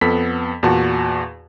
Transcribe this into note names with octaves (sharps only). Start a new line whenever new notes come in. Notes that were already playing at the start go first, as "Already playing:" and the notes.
F2 B3 A4 B6
E2 A#2 F#4 A5